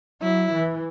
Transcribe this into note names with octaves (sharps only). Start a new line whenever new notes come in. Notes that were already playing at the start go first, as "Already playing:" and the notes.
F#3 E4
E3